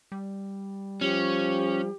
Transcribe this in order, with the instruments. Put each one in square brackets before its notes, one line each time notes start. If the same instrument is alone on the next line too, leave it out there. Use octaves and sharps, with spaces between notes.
[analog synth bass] G3
[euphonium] F3 [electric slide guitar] C#4 [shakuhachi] G4